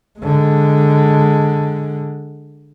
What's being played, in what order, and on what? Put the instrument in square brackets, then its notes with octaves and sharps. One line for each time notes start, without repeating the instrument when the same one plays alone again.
[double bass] D3 G#3